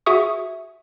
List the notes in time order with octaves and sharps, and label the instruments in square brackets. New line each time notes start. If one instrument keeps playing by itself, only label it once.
[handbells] F#4 G#4 E5 C#6 D#6